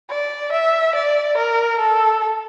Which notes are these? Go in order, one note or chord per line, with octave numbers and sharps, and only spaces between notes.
D5
E5
D5
A#4
A4